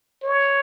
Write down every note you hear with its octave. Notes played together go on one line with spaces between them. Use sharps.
C#5